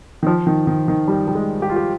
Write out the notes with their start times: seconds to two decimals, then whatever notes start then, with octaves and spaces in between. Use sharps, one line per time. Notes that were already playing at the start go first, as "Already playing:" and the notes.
0.23 D#3
0.27 F3
0.47 D#3
0.67 D#3
0.88 D#3
1.08 G3
1.27 G3
1.35 G#3
1.62 G4
1.70 F4
1.76 G4